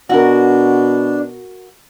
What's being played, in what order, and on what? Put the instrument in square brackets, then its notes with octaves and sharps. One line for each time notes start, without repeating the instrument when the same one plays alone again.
[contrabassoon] B2 [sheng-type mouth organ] D4 [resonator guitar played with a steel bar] F#4 A#4